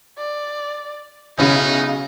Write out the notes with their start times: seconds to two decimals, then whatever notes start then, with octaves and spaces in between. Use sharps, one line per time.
0.18 D5
1.38 B1 C#3 B3 C#4 D#4 E4 F5